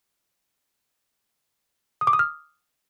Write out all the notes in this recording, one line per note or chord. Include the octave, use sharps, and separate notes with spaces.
D#6
D6
D#6
F6